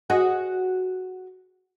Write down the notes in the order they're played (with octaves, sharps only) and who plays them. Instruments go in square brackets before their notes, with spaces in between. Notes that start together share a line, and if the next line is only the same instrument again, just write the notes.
[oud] F#4 G#4 D#5